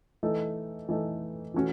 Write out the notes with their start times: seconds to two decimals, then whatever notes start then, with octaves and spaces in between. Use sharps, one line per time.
0.23 E3 A3 D#4 A4
0.89 E3 A3 D#4 A4
1.54 E3 A3 C#4 F#4